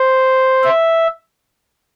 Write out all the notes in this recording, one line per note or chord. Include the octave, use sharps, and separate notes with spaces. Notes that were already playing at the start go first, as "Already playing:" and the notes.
Already playing: C5
E5